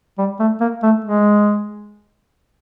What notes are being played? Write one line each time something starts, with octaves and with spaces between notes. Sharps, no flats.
G3
A3
A#3
A3
G#3